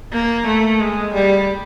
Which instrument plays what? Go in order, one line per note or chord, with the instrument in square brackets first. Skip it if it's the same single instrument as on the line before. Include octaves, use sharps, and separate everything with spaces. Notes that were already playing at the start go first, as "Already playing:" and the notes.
[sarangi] A#3
A3
G#3
G3